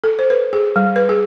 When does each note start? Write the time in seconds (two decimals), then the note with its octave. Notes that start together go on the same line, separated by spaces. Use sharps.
0.04 A4
0.19 C5
0.30 B4
0.53 G#4
0.76 G3
0.96 B4
1.09 G#4